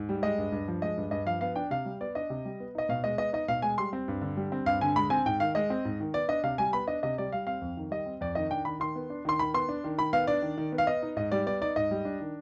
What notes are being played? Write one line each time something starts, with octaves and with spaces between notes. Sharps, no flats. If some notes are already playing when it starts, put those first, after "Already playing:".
Already playing: G#2
G3
G#3 D#5
G2
G2
F3
G#3 D#5
G2
G2 D#5
F3 F5
B3 F5
D4 G5
C3 F5
G3
B3 D5
D4 D#5
C3
G3
B3
D#4 D#5
B2 F5
G#3 D#5
B3 D#5
D#4 D#5
B2 F5
G#3 G#5
G3 C6
C4
G2
D3
G3
C4
G2 F5
D3 G#5
G#3 B5
C4 G#5
G#2 G5
D#3 F5
G#3 D#5
C4
G#2
D#3
B3 D5
D4 D#5
C3 F5
G3 G#5
B3 B5
D4 D#5
C3 D#5
G3 D5
G3 F5
C4 F5
F2
D#3
G3 D#5
C4
F2 D5
D#3 D#5
D4 G5
D#3 B5
D#3 C6
B3
D4
D#3 C6
D#3 B5
B3 C6
D4
D#3
D#3 B5
B3 F5
D4 D5
D#3
D#3
B3
F5
B3 D#5
D#4
G#2 D#5
G3 D5
B3 D5
D#4 D5
G#2 D#5
G3
D4
D#3